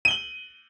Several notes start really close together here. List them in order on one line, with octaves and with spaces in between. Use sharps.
D#7 G7 F#7